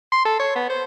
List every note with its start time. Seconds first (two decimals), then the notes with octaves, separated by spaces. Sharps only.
0.12 C6
0.25 A4
0.40 C#5
0.56 B3
0.70 C5